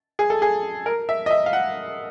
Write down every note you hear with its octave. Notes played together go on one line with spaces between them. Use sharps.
G#4
A4
G#4
A#4
E5
D#5
E5
F5
F#5